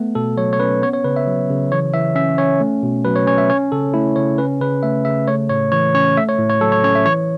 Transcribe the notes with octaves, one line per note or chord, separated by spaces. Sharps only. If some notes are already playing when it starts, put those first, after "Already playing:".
Already playing: A3 B3
B2 A4
F#3 C#5
C#5
C#4 B4
B3 C#5
C#5
C#3 B4
E5
F#3
C#3
E3 C#5
E3 E5
C#4 E5
C#4 C#5
A3
B2
F#3 B4
C#5
C#4 C#5
E5
C#4 C#5
C#3 A4
A3 E4
C#3 C#5
C#4 B4
C#3 B4
A3 E5
C#3 E5
A3 C#5
A2 C#5
E3 C#5
C#4 C#5
A3 E5
C#5
A2
C#5
F#3 A4
C#5
C#4 C#5
E5
E3 C#5